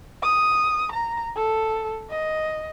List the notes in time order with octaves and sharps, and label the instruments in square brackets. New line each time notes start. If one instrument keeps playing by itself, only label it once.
[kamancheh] D#6
A#5
A4
D#5